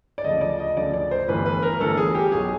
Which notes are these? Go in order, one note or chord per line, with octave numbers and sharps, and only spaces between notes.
D5
D2 C#3 F3 D#5
D5
D#5
D2 C#3 F3 D5
D5
C5
G1 G2 E3 A3 B4
B4
A#4
G1 G2 E3 A3 A4
G#4
G4
B1 B2 F#3 G#4